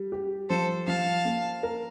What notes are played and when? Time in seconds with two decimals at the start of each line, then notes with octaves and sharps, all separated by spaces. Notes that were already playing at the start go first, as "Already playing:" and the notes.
Already playing: G3
0.12 G4
0.49 F3 A4 C5
0.87 F3 F5 A5
1.25 A#3
1.63 A#4